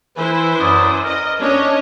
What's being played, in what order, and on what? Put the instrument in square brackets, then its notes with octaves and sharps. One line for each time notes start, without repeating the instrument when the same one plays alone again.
[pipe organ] E3 [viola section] E4 B4 C5
[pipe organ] F#2 D5 D#6
[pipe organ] A#4 [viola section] D#5
[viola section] C#4 C#5 D#5 [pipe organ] D4